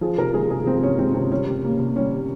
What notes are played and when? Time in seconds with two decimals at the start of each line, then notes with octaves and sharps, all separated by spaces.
0.01 F3 G#4
0.18 C3 A#4
0.34 G#3 G#4
0.50 C3 G#4
0.66 F3 C4
0.83 C3 C#4
0.99 G#3 C4
1.14 C3 C4
1.31 G3 C#4
1.47 C3
1.64 A#3
1.79 C3
1.96 G3 C#4
2.12 C3